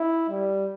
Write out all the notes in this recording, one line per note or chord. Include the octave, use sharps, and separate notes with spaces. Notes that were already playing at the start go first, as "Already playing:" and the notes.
Already playing: E4
G3